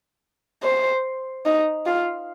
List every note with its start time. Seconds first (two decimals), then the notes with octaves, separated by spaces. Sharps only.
0.63 C5
1.45 D#4
1.86 F4